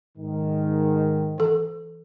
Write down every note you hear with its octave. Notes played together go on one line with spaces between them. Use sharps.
G#2 D#3
E3 A4